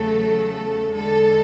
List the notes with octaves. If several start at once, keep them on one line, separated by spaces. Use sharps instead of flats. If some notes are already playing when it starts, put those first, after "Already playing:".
Already playing: E2 C#3 F#3 A3 A4
E2 D3 G#3 A4